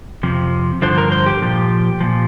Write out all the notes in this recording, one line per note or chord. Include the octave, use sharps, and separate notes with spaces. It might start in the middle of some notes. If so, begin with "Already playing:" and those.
F2 C3 F3
G2 D3 F3 C5
A#4
C5
G4
A#2 F3
A#2 F3